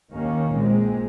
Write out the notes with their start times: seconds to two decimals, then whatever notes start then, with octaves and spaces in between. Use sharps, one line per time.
0.12 D#2 D#3 A#3 C#4
0.54 A#1 A#2 G#3 C4